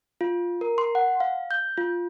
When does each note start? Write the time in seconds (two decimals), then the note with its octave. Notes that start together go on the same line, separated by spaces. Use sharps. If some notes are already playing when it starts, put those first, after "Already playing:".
0.21 F4
0.61 A#4
0.78 C6
0.95 F#5
1.20 F5
1.51 G6
1.77 F4